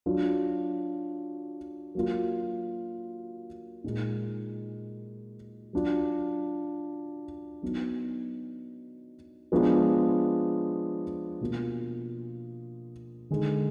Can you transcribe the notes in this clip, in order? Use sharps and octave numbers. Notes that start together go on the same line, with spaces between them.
F#3 D4 F4
F#3 A#3 F4
A#2 G#3 D#4
F#3 D4 F4
F#3 B3 D#4
F3 G#3 B3 D4 F4
B2 A#3 F4
D3 G#3 D#4